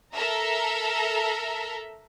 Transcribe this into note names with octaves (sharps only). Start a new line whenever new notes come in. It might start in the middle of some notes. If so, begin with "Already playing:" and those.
A4 A#4 E5 A#5